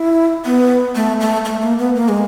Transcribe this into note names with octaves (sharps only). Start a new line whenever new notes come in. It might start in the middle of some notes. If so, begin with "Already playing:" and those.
Already playing: E4
B3
A3
A3
A3
A#3
B3
A#3
G#3